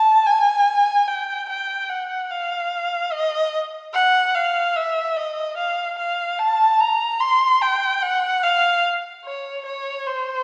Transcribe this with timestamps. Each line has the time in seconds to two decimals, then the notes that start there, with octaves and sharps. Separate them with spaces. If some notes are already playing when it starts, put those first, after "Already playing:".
Already playing: A5
0.27 G#5
1.08 G5
1.49 G5
1.90 F#5
2.31 F5
3.12 D#5
3.94 F#5
4.35 F5
4.76 E5
5.17 D#5
5.57 F5
5.98 F5
6.39 A5
6.80 A#5
7.20 C6
7.61 G5
8.03 F#5
8.43 F5
9.25 C#5
9.66 C#5
10.07 C5